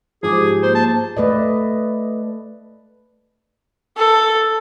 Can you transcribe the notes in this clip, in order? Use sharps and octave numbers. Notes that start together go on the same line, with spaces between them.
G#2 F3 G#4 C5 G#5 D6
G4
A#3 C5
A5
A3 B4 D5 D#5
A4